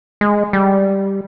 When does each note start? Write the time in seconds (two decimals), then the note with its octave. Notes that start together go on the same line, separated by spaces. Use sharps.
0.21 G#3
0.53 G3